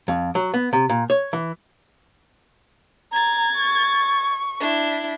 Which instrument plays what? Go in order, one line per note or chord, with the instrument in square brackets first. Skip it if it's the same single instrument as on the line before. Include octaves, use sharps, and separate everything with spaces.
[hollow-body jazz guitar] F2
F#3
B3
C3
A#2
C#5
E3
[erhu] A#5 [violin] G#6 A6
[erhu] C#6
[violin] D4 E4